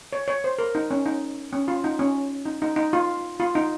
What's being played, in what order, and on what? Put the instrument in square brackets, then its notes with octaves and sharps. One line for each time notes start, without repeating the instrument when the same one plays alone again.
[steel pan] C#5
C#5
C5
A#4
D#4
C#4
D#4
C#4
F4
D#4
C#4
D#4
D#4
D#4
F4
F4
D#4